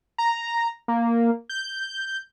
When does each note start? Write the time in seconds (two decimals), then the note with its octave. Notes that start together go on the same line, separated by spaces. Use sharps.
0.18 A#5
0.88 A#3
1.49 G6